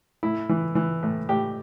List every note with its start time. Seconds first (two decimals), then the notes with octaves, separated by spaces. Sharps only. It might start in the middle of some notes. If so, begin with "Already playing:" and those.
0.23 A2 E4
0.49 E3
0.75 E3
1.03 A2
1.29 A2 G4